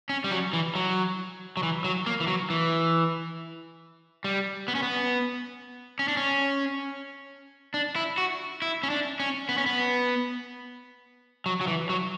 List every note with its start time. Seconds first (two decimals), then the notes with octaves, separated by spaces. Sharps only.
0.09 C#4
0.24 G3
0.31 F#3
0.53 E3
0.75 F#3
1.57 F#3
1.63 E3
1.84 F#3
2.06 A#3
2.20 E3
2.27 F#3
2.50 E3
4.24 G3
4.68 B3
4.75 C#4
4.82 B3
5.99 C#4
6.08 D4
6.17 C#4
7.74 D4
7.96 E4
8.18 F#4
8.62 E4
8.83 C#4
8.90 D4
9.20 C#4
9.49 B3
9.58 C#4
9.66 B3
11.46 F#3
11.61 F#3
11.67 E3
11.90 F#3